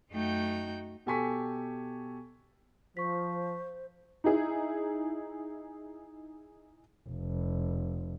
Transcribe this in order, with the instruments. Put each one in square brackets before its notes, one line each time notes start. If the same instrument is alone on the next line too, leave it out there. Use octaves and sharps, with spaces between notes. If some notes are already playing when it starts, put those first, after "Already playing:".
[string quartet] F#2 A3 D#4 F#4 G5 G6
[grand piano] B2 G4 A4 G#5 C#6 B6
[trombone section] F3 [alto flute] C5 [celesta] C#6 B6
[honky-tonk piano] D#4 E4 G#4
[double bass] F1